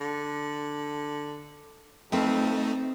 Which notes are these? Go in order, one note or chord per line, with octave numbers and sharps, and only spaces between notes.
D3
F2 A3 C4 D#4 B4 G5